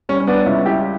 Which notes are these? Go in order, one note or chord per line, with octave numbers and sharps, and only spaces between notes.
G3 C#4
C#4
B3 D4
C#2 C#4 E4
E4 G4